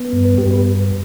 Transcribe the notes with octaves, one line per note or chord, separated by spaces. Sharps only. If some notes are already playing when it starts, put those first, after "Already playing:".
Already playing: B3
G2
B4
G2 G4
B4